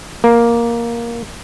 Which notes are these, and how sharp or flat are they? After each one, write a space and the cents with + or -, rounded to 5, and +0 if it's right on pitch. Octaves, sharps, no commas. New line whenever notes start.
A#3 +5